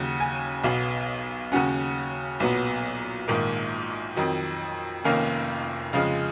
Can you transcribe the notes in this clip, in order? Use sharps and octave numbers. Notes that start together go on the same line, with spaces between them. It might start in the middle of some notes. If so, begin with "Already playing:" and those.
Already playing: D#2 C#3 F#3 F#5
G#5
B1 B2 F#3 B3 F5
D#2 C#3 F#3 C#4 F#5
B1 A#2 F#3 B3
A#1 G#2 D#3 A#3
F2 D#3 F#3
F1 F2 D#3 A#3 C#4 F5
F2 C#3 F3 G#3 F5